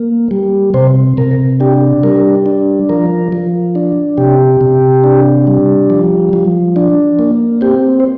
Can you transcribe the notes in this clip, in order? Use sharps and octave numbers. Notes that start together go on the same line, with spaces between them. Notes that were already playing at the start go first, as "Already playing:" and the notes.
Already playing: A#3
G3
C3 C5
C3 A#4
D4 G4
G3 A#4
D4
F3 A#4
F3
D4
C3 G4
C3
D4
G3
F3
F3
D4
A#3
C4 G4
C5